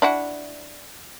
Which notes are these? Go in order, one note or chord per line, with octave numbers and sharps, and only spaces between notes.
D4 E4 F#4